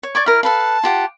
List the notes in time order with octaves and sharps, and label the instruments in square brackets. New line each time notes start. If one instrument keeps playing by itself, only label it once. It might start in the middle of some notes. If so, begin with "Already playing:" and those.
[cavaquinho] C#5
[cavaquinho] D5 C#6 D6 [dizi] G#6
[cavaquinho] E4 A#4 [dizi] F6
[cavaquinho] A4 B4 F5 [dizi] A5
[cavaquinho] F4 G4 F#5